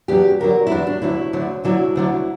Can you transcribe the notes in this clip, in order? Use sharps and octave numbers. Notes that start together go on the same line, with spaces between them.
E2 D3 F#3 G4
E2 D3 F#3 A#4
E4
E2 D3 F#3 D4
D4
D2 D3 F#3 E4
D2 D3 F#3
D2 D3 F#3 E4
D2 D3 F#3